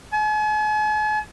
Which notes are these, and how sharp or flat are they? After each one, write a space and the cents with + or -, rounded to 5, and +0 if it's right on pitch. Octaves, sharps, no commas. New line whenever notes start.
G#5 +45